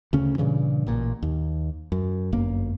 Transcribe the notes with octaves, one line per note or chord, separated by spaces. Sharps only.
D2 C#3 C#4
G2 A#2 C#3 E3
A1 A#2
D#2
F#2
G1 F#2 A#3